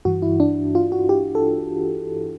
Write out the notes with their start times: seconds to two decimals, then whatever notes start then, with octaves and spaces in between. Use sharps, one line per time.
0.05 G2 E3 F#4
0.22 E4
0.40 D4
0.75 F4
0.92 F#4
1.09 G4
1.35 A4